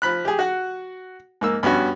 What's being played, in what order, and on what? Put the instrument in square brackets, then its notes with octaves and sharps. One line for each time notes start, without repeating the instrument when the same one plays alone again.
[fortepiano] F3 B5 F#6
G4 G#4
F#4 F#5
G#2 A#3 E6
G2 B3 C#4 F#4